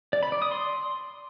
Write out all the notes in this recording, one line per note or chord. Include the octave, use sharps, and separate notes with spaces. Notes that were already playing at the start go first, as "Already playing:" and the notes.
D5
B5
D5
D#6
C6